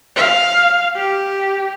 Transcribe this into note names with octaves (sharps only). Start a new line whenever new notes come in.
F5
G4